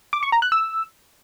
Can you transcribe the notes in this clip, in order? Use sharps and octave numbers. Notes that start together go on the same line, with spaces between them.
D6
C#6
A#5
F#6
E6